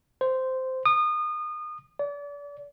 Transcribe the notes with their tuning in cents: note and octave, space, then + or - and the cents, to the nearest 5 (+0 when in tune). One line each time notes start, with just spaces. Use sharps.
C5 -10
D#6 -30
D5 -35